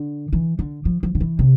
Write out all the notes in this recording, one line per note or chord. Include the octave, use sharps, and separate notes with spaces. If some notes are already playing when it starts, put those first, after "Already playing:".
Already playing: D3
E3
D3
F3
F3
D3
E3
C3